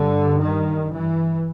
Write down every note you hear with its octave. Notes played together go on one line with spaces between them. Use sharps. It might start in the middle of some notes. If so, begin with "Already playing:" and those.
Already playing: G2 D3
D#3
E3